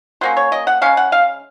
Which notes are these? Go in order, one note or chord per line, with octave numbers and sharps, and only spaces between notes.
F#3 A#3 C#4 C5
C#5
D#5
F#5
C#3 G#3 C#4 F5
F#5
F5